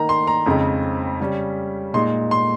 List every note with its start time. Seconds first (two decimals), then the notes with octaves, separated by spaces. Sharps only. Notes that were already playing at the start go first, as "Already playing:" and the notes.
Already playing: D#3 A#3 D#4 A#5
0.09 C6
0.27 A#5
0.46 F2 C#3 G#3 C4 D#4
1.20 C#3 G3 C#4
1.94 A#2 G#3 D#4 C6
2.31 C6